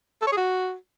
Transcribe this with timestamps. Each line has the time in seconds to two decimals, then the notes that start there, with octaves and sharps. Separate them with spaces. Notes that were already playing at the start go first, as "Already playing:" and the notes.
0.22 A4
0.27 C#5
0.32 G#4
0.37 F#4